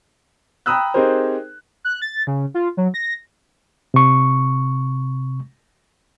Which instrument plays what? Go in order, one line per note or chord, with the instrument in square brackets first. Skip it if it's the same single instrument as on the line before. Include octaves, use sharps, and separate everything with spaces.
[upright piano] G5 A#5 B5 D#6 E6 F#6
C4 D#4 G4 G#4 A#4 C5
[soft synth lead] F#6
A6
C#3
F4
F#3
A#6
[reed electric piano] C3 C#6